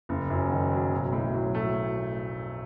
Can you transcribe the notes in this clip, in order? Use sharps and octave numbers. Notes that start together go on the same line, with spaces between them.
F#1
F#2
D#3
F#3
B1
A2
F#3
A3